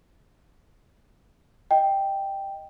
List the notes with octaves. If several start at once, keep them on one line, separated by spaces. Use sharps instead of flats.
D#5 G5